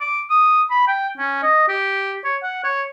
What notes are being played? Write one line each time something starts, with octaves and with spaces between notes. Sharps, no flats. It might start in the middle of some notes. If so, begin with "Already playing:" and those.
D6
D#6
B5
G5
C#4
D#5
G4
C#5
F#5
C#5